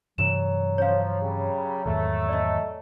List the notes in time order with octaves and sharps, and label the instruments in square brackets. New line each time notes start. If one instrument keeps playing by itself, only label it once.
[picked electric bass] G2 C3 E3 [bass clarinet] F#3 [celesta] E7
[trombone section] F3 [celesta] C#5 F5
[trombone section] C#3 G3
[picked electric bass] E2 G#2 D#3 [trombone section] A3
[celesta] D5 D#5